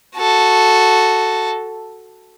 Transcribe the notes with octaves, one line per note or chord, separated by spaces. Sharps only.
F#4 A4